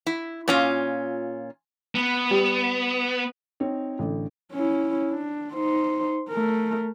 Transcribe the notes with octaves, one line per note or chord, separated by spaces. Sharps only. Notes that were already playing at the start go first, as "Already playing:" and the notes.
E4
A#2 C#4 F4
B3
G3
C4 D#4 C#5
A1 D3
C#4 E4
D4
D#4 C5
A3 A#4